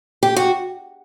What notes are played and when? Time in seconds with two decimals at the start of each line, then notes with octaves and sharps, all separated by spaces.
0.23 G4
0.36 F#4